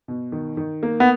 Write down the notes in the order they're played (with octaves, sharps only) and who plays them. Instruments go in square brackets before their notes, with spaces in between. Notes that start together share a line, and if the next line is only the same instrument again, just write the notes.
[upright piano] B2
D#3
D#3
A#3
[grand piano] B3